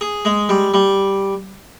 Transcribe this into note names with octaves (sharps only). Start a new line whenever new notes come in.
G#4
G#3
G3
G3